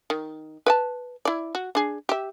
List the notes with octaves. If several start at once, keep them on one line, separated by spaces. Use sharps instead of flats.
D#3
B4 G5 A5
E4 D5
F#4
D4 G#4
G4 E5